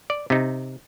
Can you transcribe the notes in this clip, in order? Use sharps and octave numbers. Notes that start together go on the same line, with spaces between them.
D5
C3 D#4